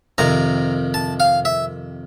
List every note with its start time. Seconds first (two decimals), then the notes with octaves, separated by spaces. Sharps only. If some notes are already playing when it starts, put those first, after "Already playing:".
0.18 F2 C3 D#3 A#5
0.94 A5
1.20 F5
1.45 E5